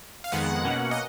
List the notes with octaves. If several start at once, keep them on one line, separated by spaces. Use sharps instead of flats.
F5
F2 D#3 G#3 B3 F#5
B2 A#3 C#4
D#5